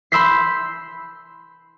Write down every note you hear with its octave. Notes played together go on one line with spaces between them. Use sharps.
B5 C6 E6 G6 B6 C7